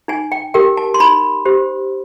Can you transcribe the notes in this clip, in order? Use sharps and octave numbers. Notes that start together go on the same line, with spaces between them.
D#4 G#5
G5
G4 A#4 G5
A5
C6
D#4 B5
G4 C5